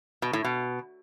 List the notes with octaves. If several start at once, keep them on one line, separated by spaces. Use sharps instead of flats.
B2
A2
B2